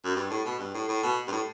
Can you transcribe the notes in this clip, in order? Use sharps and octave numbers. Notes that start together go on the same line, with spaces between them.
F#2
G2
A2
B2
G2
A2
A2
B2
G2
A2